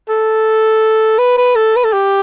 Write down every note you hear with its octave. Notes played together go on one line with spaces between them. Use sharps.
A4
B4
B4
A4
B4
A4
G4